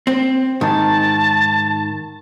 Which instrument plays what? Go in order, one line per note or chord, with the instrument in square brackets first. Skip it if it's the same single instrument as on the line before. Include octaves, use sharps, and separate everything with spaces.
[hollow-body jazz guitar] C4
[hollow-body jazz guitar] G#2 D#3 [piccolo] A5